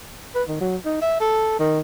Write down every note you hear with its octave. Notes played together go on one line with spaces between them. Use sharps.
B4
D#3
F#3
D#4
E5
A4
D#3